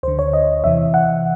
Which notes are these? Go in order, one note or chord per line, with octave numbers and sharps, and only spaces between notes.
D2 D3 C5
C#5
D#5
E2 C3 E3 E5
F#5